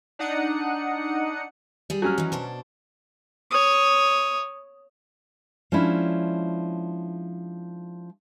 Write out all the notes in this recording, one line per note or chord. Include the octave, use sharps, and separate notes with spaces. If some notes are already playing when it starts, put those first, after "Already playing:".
D4 D#4 F#5 D#6 C#7
G3 G#4
F#3 C#4 F6
E3 D#4
B2 D4 C5
C#5 D#6
F3 G#3 C#4 D4 E4